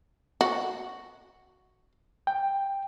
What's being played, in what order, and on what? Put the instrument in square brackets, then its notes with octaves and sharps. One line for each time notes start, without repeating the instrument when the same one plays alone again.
[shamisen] F#4
[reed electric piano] G5